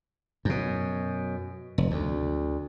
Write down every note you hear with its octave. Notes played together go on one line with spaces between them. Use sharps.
F#2 B2
F1
D2